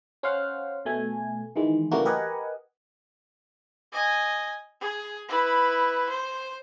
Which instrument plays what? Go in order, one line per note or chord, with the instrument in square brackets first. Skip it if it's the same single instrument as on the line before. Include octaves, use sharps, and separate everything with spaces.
[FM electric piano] C#4 C5 F5 F#5
B2 A3 G#5
D#3 E3 G#3
C#3 E3 G3 A3 A#3 F#4
G4 A#4 B4 D#5 F#5 G#5
[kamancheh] D#5 G#5
G#4
E4 B4
C5